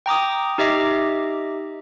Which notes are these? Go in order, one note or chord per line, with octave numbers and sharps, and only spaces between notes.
G5 A#5 D6 D#6
D#4 G4 D#5 E5 D6